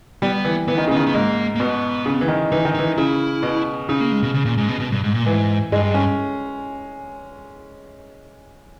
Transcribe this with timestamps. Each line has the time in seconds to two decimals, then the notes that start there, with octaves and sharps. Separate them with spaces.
0.22 G3 B3
0.45 E3
0.68 E3 B3
0.78 D#3
0.88 C#3 B3
0.97 D#3
1.07 B3
1.14 G#2 A#3
1.56 A#3
1.60 B2 B3
2.06 C#3
2.21 E3
2.28 D#3
2.52 E3 D#4
2.65 D#3
2.75 E3 D#4
2.98 C#3 E4
3.43 B2
3.89 C#3 D#4
4.00 A#3
4.12 G#3
4.23 B2
4.34 C#3
4.46 A#2
4.58 G#2
4.68 B2
4.80 B2
4.92 G2
5.04 G#2
5.14 A#2
5.26 G#2 E3
5.72 G2 G#3
5.94 C#4